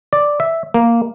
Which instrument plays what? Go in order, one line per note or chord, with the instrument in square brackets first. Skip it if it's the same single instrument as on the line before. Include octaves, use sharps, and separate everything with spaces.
[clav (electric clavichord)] D5
E5
A#3